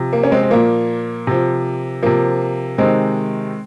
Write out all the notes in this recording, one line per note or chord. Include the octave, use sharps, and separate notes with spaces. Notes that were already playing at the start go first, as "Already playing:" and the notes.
Already playing: C3 F3
A#3
C#4
G#3 C4
C4
A#2 F3 A#3
C3 F3
C3 F3 A#3
C3 D#3 G#3 C4